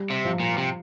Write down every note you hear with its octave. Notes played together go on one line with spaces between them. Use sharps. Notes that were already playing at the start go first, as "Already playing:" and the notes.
Already playing: G3
C3
F3
A#2
C3